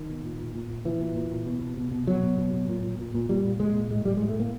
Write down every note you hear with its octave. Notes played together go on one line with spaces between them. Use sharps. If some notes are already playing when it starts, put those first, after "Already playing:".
Already playing: D#3
B2
A#2
A#2
A#2
A#2
A#2 E3
A#2
A#2
A#2
B2
B2
B2
B2
B2 F#3
B2
B2
B2
A#2
A#2
A#2
A#2
A#2 G3
A#2
A#2 G#3
A#2
A2 G#3
A2 G3
A2 G#3
A3
A2 A#3